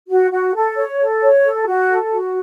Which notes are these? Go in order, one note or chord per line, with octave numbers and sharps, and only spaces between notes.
F#4
F#4
A4
C#5
A4
C#5
A4
F#4
A4
F#4